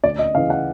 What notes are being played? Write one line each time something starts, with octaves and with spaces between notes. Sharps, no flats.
D2 D5
D#5
C#3 E3 F5
F#5